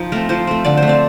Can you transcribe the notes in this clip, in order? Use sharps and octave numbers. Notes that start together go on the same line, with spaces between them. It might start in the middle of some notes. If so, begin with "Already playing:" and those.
Already playing: F3 D#4
A3 C4 A#4
F3 C5
A3 C4
D3 D5
A3 C5
C4 D5